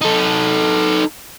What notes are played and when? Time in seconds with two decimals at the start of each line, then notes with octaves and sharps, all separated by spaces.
0.01 D#4 A4